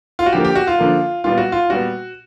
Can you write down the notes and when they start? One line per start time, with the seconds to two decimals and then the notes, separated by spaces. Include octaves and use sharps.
0.19 F4
0.26 F#4
0.33 D3 F3 A#3 G4
0.45 G4
0.55 F#4
0.67 F4
0.79 D3 F3 A#3
1.24 A#2 G3 B3 F4
1.38 F#4
1.52 F4
1.70 A#2 G3 B3 F#4